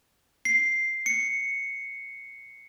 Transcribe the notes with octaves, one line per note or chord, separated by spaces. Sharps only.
C7
C#7